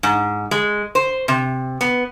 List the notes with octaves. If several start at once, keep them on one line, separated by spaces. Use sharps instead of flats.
G#2
G#3
C5
C3
B3